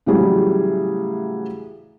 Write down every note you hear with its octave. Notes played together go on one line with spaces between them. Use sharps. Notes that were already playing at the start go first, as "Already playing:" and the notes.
A2 C#3 E3 F#3 G3 G#4